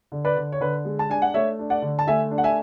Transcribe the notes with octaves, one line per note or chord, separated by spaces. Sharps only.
D3
B4 D5
D3
C#5
D3 B4
G#3
A5
D4 G#5
F#5
A3 C#5 E5
D4
D5 F#5
D3
A5
A3 E5 G#5
D4
F#5
E5 G#5